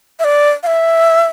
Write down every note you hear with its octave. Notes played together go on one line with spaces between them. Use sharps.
E5
D5
F5
E5